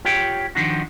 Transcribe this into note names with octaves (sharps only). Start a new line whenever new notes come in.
F4 G4 C#5 G5
D#3 F3 D4 D#4 F#4